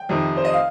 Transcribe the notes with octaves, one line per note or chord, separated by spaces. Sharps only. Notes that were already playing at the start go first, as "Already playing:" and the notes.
Already playing: G5
F2 C3 D#3
C5
D#5
F5